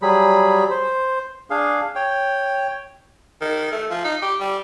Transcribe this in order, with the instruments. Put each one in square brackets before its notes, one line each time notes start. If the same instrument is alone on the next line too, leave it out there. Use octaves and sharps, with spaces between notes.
[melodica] F#3 G3 G#4 B5
C5
D4 G#4 F5
C#5 G5
[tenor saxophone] D#3
A3
F3
D#4
G4
G3